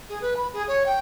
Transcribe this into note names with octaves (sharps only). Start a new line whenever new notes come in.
G#4
B4
B5
G#4
C#5
G5